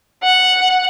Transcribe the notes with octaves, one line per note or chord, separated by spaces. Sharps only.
F#5